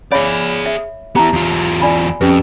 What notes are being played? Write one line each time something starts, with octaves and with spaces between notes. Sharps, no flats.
G#4 C#5 D5 F5 B5
E5
B3 E4 G4 A5 A#5
E2 F4
D5 G#5 B5
F2 C#4 G4 B4